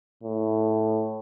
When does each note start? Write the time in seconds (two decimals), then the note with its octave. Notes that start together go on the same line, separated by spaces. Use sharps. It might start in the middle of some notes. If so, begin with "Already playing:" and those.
0.23 A2